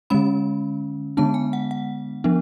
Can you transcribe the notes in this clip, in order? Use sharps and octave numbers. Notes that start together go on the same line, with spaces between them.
D3 G#3 C#4 B5
D3 G#3 B3 D4 A5
G#5
F#5
F#5
F3 B3 D4